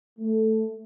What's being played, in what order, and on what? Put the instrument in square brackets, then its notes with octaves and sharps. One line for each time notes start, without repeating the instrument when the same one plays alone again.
[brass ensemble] A3